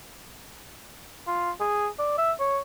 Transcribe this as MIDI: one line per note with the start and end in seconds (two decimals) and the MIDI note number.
1.27 1.51 65
1.61 1.88 68
1.99 2.13 74
2.18 2.32 76
2.40 2.59 73